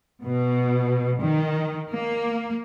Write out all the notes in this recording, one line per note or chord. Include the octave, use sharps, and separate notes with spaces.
B2
D#3
A#3